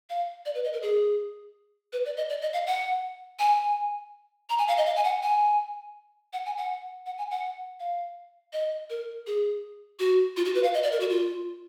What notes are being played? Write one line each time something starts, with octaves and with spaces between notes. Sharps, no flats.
F5
D5
B4
D#5
A#4
G#4
B4
D5
D#5
D5
D#5
F5
F#5
G#5
A#5
G#5
F5
D#5
F5
G#5
F#5
G#5
F#5
G#5
F#5
F#5
G#5
F#5
F5
D#5
A#4
G#4
F#4
F4
F#4
B4
F5
D#5
D5
A#4
F#4
F4